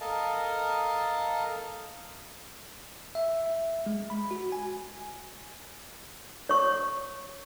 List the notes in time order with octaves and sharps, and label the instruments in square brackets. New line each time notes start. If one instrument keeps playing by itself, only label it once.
[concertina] A4 A#4 D#5 F5 A5
[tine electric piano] E5
G#3
B5
F#4
G#5
[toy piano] C#5 C#6